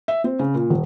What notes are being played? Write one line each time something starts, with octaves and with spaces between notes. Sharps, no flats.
E5
C4
C#3
A#2
D#1